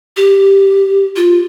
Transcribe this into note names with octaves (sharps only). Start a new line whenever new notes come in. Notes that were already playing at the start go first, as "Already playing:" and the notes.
G4
F4